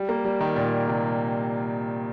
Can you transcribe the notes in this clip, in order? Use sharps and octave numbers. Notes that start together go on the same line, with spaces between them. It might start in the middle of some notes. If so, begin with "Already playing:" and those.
Already playing: G3
A#3
G3
D#3
A#2
C3